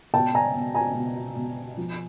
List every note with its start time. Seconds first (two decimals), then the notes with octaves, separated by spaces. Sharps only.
0.14 B2 G5 A5
0.35 G#5 A#5
0.55 B2
0.75 G#5 A#5
0.95 B2
1.36 B2
1.77 F3